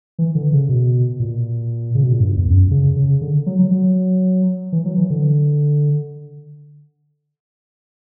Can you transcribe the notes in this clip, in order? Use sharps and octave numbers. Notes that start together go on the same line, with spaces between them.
E3
D3
C#3
B2
A#2
C#3
B2
A#2
G2
E2
F#2
C#3
C#3
D3
F#3
F#3
F#3
E3
F#3
E3
D3